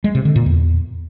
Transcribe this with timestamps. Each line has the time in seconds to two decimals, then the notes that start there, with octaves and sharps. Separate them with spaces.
0.04 G#3
0.15 C3
0.25 D3
0.36 A#2
0.46 E2